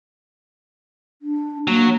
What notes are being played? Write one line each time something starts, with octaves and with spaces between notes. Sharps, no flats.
D4
F#3 A#3